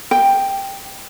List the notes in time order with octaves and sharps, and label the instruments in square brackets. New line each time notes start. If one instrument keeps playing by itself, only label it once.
[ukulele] G5